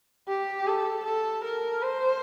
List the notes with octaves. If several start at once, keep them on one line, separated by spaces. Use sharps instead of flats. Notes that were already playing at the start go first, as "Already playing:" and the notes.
G4
A4
A4
A#4
C5